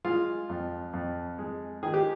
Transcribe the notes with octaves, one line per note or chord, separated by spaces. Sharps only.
G#3 F4
F2
F2
G#3
D#3 G#4
G4